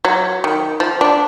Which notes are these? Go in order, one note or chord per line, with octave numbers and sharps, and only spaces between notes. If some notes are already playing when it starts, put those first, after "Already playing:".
F#3
D#3
F3
D4